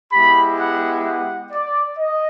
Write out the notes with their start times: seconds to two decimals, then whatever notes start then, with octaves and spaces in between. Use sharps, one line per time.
0.12 G#3 B3 E4 G4 B5
0.59 F#5
1.06 F#5
1.52 D5
1.98 D#5